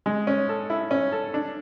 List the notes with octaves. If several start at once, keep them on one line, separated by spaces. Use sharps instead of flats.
G#3
C#4
A4
E4
C#4
A4
D4